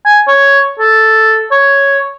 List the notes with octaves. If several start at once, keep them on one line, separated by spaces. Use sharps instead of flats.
G#5
C#5
A4
C#5